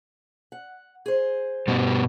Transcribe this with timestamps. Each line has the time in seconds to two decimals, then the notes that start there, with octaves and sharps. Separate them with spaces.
0.52 F#5
1.06 G#4 C5
1.68 G2 B2 G3